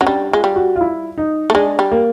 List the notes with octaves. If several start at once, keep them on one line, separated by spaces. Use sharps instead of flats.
F#3 C#4
G3 D4
G#3 F4
G3
F#4
F4
E4
D#4
A3
G#3 D4
G3
A#3